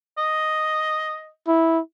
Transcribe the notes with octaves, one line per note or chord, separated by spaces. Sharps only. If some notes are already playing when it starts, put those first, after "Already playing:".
D#5
E4